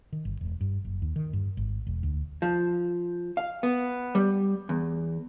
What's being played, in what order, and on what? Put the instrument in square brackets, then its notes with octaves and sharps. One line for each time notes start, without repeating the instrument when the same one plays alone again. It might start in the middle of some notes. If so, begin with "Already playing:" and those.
[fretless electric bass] D#3
G1
E1
G2
F#1
D#2
D#3
G2
G#1
E1
D2
[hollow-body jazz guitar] F3
F5
B3
G3
E2